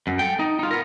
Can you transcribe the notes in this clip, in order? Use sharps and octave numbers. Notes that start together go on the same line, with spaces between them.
F#2
A4 G5
D#4
D#4 F4
B3 A#4